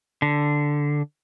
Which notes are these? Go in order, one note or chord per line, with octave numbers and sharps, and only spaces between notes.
D3